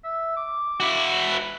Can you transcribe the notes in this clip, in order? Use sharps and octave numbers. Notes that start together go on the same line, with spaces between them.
E5
D6
E4 F#4
B4